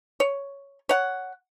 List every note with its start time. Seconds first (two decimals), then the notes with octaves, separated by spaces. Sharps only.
0.20 C#5
0.89 C#5 F#5